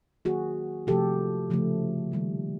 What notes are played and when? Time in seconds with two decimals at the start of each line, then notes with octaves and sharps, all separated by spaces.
0.25 D#3 F#3 A#3 F#4 G#4
0.87 C3 F3 A3 G4 A4
1.50 C#3 F3 A3
2.12 D#3 G3 A#3